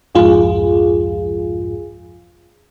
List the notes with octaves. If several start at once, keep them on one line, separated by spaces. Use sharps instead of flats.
C2 F2 G#2 F4 G#4